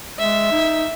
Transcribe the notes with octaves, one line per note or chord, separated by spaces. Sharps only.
G#3 E5
D#4